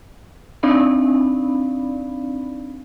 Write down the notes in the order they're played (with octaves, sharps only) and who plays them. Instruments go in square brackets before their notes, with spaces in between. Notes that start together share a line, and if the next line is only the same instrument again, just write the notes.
[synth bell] C4 D4 D#4 D5 F5 B5